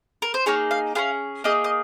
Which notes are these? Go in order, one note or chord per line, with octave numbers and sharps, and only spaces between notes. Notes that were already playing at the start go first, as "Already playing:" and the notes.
A#4
C5
A#3 D#4 G#4 C#5
F5
C#4 F4 G#4 F5
A#3 D#4 G#4 D#5
D#5